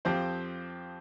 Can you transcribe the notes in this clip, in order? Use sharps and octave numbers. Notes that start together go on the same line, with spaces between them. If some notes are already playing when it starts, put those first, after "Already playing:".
F2 F3 C4 G4 C5